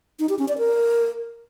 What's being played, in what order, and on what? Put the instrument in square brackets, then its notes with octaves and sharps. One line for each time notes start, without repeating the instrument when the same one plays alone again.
[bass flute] D#4
G4
C#4
D5
A#4